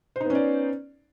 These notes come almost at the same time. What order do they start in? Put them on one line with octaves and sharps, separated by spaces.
C5 D#4 B3 C#4 D5